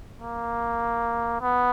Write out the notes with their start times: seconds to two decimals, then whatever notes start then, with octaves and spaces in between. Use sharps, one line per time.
0.22 A#3
1.41 B3